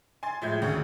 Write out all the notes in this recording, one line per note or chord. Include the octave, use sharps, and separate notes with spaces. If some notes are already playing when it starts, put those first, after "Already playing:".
G#5 C6 A6
A2 F3 G#3 E5 G6 G#6
G#1 D2 C#3 C#6